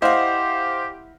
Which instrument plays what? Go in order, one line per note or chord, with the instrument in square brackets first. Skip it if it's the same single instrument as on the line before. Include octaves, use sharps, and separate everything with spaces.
[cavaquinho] E4 F#5 [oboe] G4 [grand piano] C5 D#5 F5